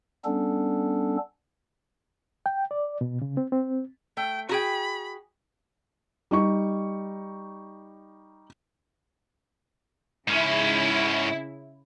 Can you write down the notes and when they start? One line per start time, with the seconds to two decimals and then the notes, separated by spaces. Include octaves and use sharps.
0.25 G3 B3 C#4 D4 A4
2.46 G5
2.71 D5
3.01 B2
3.22 C#3
3.37 C4
3.52 C4
4.17 A3 G5
4.49 F#4 G#4 G5 B5
6.31 G3 D#4 C#6
10.28 G#2 C#3 C#4 E4